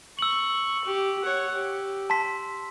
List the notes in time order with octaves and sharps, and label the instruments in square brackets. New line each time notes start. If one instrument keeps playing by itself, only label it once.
[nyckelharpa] C#6 [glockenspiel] E6 F#7
[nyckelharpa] G4
C#5 F#5
G4
[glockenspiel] A5 C6 B6